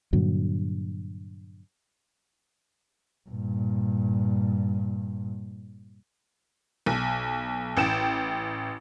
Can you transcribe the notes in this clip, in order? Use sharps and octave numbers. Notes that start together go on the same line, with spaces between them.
G2 A#2 D3 F#3
G2 A#2
B1
A1 G5 E7